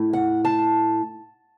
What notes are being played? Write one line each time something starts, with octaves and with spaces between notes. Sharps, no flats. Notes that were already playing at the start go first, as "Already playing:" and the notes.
Already playing: A2 A3 E4
F#5
A5